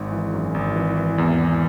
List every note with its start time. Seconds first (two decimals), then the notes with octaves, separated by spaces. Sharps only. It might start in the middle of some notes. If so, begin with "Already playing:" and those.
Already playing: G#1 G#2
0.12 E3
0.34 F#2
0.54 G#1
0.76 E3
0.97 E3
1.18 E2
1.39 E3